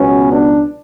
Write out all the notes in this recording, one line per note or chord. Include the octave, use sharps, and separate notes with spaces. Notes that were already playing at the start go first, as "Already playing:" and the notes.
Already playing: C#2 B2 F#3 B3 C#4
D4